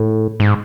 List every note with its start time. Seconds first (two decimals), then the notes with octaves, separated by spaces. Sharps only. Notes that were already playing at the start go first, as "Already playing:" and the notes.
Already playing: A2
0.40 G#2